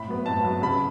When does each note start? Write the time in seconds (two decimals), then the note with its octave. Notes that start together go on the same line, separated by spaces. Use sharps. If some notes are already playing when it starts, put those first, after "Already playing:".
Already playing: A2 B5
0.08 F#3 B3
0.26 A2 A5
0.44 F#3 B3
0.62 C#3 B5